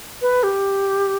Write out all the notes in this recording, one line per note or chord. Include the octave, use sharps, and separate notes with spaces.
B4
G4